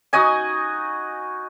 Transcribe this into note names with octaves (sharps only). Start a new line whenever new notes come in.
D#4 F#4 D#5 G#5